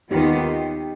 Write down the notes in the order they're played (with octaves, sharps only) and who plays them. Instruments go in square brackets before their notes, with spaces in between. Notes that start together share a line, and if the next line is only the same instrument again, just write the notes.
[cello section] D#2 D#3 B3 F4 [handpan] D#4 G4